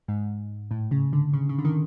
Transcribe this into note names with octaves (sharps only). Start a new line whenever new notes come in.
G#2
A2
C#3
D3
C#3
C#3
D3
D#3